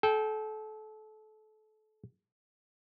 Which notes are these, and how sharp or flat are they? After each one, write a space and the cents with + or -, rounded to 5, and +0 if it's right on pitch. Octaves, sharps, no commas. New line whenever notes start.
A4 -30 G5 +0